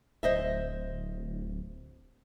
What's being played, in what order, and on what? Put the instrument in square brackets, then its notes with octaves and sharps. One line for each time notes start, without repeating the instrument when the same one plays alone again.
[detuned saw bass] D1 [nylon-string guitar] C5 D#5 E5